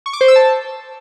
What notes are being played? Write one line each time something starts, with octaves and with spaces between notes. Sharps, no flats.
C#6
D6
C5
E6
A5